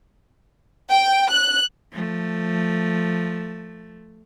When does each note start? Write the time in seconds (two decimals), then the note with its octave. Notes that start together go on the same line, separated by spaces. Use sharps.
0.89 G5
1.32 F#6
1.92 F3 A3